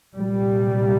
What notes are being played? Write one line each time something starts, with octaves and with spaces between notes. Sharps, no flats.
C2 A#2 G3